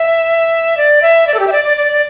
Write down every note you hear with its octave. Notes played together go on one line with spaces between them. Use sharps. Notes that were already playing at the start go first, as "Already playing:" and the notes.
Already playing: E5
D5
E5
D5
A4
G4
E5
D5
D5
D5
D5